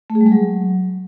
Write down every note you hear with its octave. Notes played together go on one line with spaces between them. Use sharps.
A3
G#4
G3
G#3
F#3